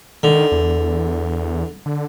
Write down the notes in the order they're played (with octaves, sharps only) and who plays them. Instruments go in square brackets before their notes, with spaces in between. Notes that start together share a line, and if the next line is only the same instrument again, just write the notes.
[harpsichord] D3 [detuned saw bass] D#3
[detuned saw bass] E2
D3